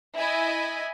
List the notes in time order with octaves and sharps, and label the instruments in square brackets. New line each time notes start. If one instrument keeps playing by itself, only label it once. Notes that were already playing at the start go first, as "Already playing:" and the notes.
[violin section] E4 D#5 E5 G#5